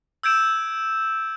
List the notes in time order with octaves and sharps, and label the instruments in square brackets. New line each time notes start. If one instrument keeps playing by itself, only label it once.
[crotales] E6 G6 G#6 D7 E7